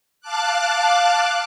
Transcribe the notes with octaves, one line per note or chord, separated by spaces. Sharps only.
F5 A5 D6 F#6